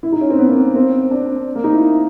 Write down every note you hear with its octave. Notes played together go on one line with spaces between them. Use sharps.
E4
D#4
C#4
C4
B3
A#3
B3
C4
D4
A#3
D#4
E4